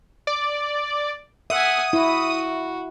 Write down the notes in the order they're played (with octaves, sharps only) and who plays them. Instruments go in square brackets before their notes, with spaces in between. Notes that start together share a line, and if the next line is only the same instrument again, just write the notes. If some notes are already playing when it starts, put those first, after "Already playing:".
[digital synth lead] D5
[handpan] E5 [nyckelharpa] F#5 G#5 [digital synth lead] D#6
[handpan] E4 [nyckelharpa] F#4